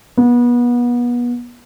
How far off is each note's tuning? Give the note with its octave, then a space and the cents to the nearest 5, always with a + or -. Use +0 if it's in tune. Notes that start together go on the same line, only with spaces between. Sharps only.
B3 -30